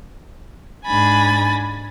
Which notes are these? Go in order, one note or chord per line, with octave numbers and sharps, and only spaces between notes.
G#2 D4 G#5 B5 A6